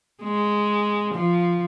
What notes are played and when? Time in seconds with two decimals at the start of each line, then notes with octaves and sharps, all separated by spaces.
0.23 G#3
1.14 F3